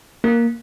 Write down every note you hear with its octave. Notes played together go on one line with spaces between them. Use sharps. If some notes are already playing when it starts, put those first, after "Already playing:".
A#3